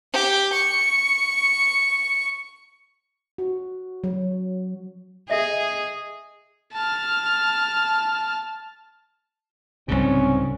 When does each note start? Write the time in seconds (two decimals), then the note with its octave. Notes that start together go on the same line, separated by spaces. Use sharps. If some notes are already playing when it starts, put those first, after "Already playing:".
0.13 G4
0.53 C#6
3.38 F#4
4.04 F#3
5.30 G#4 D#5 E5 G5
6.74 A5 F6
9.88 C2 G#2 C#3 C4 C#4